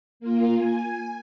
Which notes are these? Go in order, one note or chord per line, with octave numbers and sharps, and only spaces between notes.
A#3 F4
G#5